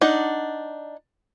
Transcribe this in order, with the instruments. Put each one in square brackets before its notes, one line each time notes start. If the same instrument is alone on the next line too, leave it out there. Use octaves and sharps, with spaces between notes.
[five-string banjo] D4 D#4 F#5